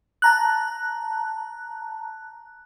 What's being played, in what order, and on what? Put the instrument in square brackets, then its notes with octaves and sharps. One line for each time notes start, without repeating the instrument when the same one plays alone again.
[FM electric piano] A5 A#5 F#6